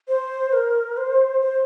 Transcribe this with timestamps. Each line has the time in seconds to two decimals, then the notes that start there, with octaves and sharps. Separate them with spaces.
0.08 C5
0.53 A#4
0.97 C5
1.42 C5